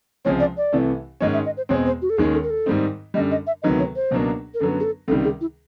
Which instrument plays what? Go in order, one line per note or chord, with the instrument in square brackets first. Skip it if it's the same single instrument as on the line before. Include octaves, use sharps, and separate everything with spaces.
[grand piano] C#2 C3 F3 G#3 C4 [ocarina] C#5
[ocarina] D5
D5
[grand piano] C2 C3 E3 A3
[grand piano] G#2 D#3 G#3 C#4 [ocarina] D#5
[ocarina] E5
D#5
C5
[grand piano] E2 B2 G#3 C4 [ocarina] C#5
[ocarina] C5
F#4
A4
[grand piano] D#2 D#3 G#3 C#4 [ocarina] G#4
[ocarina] A4
A#4
A4
[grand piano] G#2 D#3 G3 C4 D#4
[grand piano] F#2 D3 G3 [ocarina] D#5
[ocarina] D#5
E5
[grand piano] D2 C3 D#3 F#3 B3 [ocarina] D#5
[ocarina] C#5
C5
[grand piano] C#2 B2 F#3 A#3 D4
[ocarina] A#4
[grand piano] F#2 D3 F#3 B3 [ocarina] A4
[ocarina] G#4
A4
[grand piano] C#2 C3 D#3 G3 [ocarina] A4
[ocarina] G#4
E4